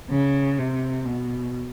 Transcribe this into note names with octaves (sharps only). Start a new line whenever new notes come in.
C#3
C3
B2